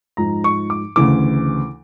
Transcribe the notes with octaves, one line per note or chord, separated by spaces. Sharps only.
G#2 F3 A#5
C#6
D6
D2 C#3 E3 D6